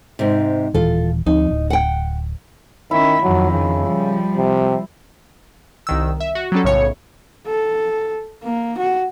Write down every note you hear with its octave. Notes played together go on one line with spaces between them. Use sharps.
G#2 C3
D#1 E3 F4 A4
D2 F3 C4 D#4
D1
F#5 G5
D#3 C#4 E4 E5
F2 D#3 F#3
C#3
F3 G3
C3
C2 D#3 E6
E5
F#4
F#3 G3 C#4 A4
B1 F#2 A2 C#3 C#5 C#7
A4
A#3
F#4